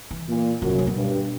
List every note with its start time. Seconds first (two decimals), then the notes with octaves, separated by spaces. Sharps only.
0.11 E3
0.28 A#2
0.61 F#2 D3
0.69 C#3
0.79 C3
0.87 B2
0.96 G2